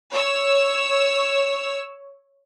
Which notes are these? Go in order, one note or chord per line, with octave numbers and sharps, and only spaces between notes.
C#5 E6